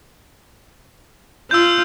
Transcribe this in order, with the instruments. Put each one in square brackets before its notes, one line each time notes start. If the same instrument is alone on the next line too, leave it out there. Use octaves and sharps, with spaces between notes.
[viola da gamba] F4 [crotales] E6 G6